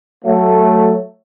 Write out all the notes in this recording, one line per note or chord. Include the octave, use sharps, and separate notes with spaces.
F#3 A3